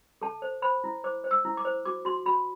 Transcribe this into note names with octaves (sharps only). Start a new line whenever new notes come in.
A4 A5
C5
C5 B5
E4
C5 D6
C5
E6
E4
D6
C5
F#4 D6
F#4 C6
F#4 B5